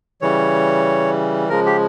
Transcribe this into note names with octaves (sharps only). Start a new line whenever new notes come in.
C#3 E3 G3 C#5
C#3 F3 G#3 A#4
G4